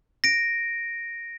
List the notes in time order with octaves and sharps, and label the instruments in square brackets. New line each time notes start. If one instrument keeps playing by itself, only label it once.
[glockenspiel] A#6 D7